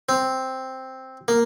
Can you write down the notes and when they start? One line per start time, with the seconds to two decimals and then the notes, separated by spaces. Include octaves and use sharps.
0.09 C4
1.28 A#3